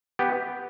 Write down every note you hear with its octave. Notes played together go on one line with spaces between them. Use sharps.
B3 G4